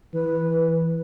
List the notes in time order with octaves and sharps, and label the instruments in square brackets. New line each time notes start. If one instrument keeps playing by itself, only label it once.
[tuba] E3 [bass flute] B4